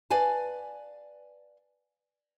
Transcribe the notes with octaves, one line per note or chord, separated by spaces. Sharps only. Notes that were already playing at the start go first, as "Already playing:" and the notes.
B4 D5 F5 G#5 A5